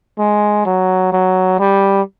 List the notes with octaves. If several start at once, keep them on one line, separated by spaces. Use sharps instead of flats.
G#3
F#3
F#3
G3